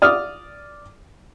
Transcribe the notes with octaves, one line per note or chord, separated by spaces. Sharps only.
D5 D#6 F6